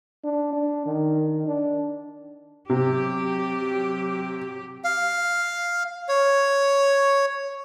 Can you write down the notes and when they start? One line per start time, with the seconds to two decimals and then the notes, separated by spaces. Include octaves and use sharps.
0.24 D4
0.52 D4
0.86 D#3
1.47 D4
2.70 C3 F#3 G4
4.84 F5
6.08 C#5